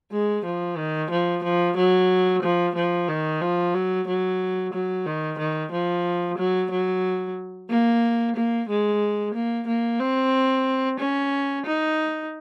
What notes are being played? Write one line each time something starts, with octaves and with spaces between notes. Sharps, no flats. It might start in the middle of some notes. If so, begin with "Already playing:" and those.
G#3
F3
D#3
F3
F3
F#3
F3
F3
D#3
F3
F#3
F#3
F#3
D#3
D#3
F3
F#3
F#3
A#3
A#3
G#3
A#3
A#3
C4
C#4
D#4